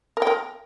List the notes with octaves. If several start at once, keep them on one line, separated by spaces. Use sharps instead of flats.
A#4
G5
A#4